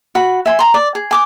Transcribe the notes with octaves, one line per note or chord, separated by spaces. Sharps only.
F#4 B5
E5 G#5 C6
A#5 C6
D5
G#4
G#5 D6 D#6